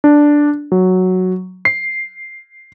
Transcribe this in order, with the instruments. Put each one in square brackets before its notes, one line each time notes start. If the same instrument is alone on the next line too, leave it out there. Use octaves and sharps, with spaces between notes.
[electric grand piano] D4
F#3
C7